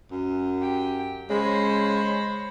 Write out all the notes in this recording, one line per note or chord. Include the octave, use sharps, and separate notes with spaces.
F#2
G4 G5
C#3 G#3 C5 C#5 B5